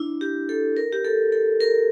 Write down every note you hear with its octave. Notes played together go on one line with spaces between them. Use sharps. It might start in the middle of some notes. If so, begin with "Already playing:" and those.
Already playing: D4 E4
G4
A4
A#4
G4
A4
A4
A#4